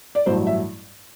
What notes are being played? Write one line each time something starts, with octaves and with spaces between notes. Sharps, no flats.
D5
A1 G2 F#3 A3 C5
E5